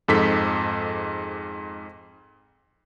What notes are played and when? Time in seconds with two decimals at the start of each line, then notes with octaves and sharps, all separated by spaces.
0.08 F2 G#2 A4 B6